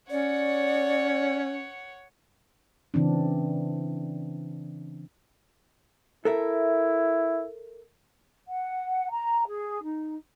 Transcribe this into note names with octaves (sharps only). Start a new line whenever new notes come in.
C#4 C#5 D5 F#5
C#3 E3 C4 D4
E4 A4 A#4 E5
F#5
A#5
G#4
D#4